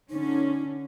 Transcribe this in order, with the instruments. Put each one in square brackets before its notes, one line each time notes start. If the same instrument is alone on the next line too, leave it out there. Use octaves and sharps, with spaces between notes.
[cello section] D3 C#4 [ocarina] D#4